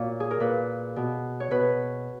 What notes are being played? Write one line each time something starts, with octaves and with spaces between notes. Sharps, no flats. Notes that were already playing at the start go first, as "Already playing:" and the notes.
Already playing: A#2 F#4 C#5
G#4
A#4
A#2 B4
B2
C#5
B2 B4